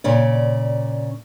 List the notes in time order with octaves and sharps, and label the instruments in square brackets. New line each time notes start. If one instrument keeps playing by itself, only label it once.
[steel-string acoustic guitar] A#2 C#3 D5